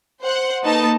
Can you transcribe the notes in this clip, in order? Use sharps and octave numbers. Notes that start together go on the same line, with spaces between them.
C5 F#5
A#3 D#4 A4 B4 D#5 A5